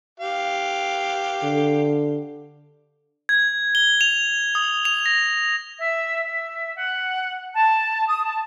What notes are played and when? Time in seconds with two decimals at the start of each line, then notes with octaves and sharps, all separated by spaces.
0.20 G4 F5
1.43 D3
3.29 G#6
3.75 G7
4.01 F7
4.55 D#6
4.85 F7
5.06 A#6
5.80 E5
6.24 E5
6.76 F#5
7.55 A5
8.07 D#6
8.24 A5